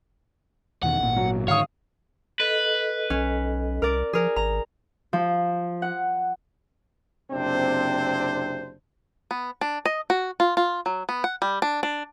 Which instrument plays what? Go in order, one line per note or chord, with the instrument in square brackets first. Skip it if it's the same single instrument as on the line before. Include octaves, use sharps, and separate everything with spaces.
[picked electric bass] E2 B2 D#3 [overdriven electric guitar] F#5
[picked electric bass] G#1 A#2
[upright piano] F#3
[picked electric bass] G#2 D3 D#3 [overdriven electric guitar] C#5 [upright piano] F5 D#6
[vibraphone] A4 D#5 [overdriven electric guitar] B4
[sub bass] B1 [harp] C#4
[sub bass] C2 [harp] A#4 D5
[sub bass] F3 [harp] G#4 A#4
[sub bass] G#1 [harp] A#5
[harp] F3
F#5
[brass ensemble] F#1 C3 C4 D4 C5
[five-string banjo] B3
D4
D#5
F#4
F4
F4
F#3
B3
F#5
G3
D4
D4